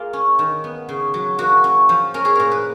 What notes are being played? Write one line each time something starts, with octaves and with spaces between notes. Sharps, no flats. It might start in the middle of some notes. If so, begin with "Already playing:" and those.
Already playing: A#3 F4 G#4
C#4
D#3
B3
C#3
F#3
A#3 F#4
C#4
F3
C#4 A#4
G#4
A#2 A#4
B4